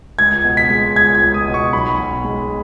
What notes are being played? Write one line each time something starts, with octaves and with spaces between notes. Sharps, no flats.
C#2 G#6
B2
B6
G#3
C#2 G#6
G#6
C#2
D#6
B2
C#6
B1 B5
B2
G#3